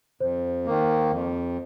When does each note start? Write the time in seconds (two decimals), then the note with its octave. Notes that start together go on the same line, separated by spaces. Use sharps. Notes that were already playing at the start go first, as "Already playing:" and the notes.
0.20 F2 C5
0.66 D#3 A#3
1.12 F2